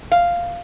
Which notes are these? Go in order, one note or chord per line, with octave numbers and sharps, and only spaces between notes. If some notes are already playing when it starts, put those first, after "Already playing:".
F5